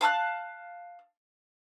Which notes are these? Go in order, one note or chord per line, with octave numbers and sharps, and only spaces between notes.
F5 A5 E6 F#6